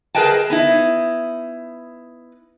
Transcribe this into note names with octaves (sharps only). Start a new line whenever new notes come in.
G#4 A#4 B4 D#5 G5 A5
B3 D#4 E4